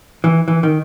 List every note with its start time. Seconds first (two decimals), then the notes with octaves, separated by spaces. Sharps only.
0.24 E3
0.48 E3
0.63 D#3